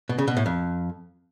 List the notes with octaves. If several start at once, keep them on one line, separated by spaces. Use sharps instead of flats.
B2
C#3
B2
A2
F2